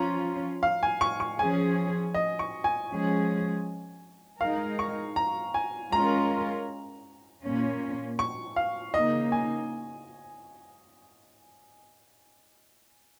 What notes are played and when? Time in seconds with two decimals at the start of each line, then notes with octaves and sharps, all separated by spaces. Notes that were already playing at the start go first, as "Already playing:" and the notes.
Already playing: F3 C#4 F4 A#5
0.63 F5
0.83 G#5
1.01 C#6
1.20 C#6
1.39 F3 C#4 G#4 G#5
2.14 D#5
2.39 C#6
2.64 G#5
2.90 F3 G#3 C#4 G#4
4.41 G#3 D#4 A#4 F5
4.79 C#6
5.16 A#5
5.54 G#5
5.92 G#3 C#4 F4 A#4 A#5
7.43 A#2 A#3 C#4
8.19 C#6
8.56 F5
8.94 C#3 A#3 D#4 D#5
9.32 G#5